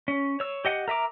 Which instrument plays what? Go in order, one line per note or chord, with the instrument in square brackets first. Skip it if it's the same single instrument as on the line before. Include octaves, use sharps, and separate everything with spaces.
[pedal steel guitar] C#4
C#5 E6
G4 D#5 F#5
A#4 E5 A#5 D6